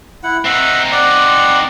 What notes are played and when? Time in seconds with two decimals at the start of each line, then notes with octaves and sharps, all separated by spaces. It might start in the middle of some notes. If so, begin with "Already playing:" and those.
0.23 E4 F#5
0.45 C4 D#4 E5 F#5
0.92 D5 F#5